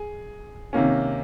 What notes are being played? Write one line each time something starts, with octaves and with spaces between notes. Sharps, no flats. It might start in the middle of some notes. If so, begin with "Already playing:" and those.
Already playing: G#4
C3 D#3 A#3 C#4